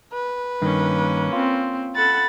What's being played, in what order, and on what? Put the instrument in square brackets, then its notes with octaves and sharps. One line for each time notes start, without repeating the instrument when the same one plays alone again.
[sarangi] B4
[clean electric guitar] G2 D#3 [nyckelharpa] A#3 C#4
[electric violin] C4 [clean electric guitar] F4
[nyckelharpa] A4 F#5 [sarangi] B5 [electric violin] A6